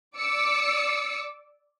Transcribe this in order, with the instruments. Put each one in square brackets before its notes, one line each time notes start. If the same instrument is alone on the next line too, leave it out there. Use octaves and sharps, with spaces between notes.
[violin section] D5 D6 E6 C#7